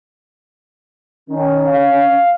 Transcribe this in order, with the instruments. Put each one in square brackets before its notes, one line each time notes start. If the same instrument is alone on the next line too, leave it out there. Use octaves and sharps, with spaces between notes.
[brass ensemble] D#3 [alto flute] C#4
[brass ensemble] F5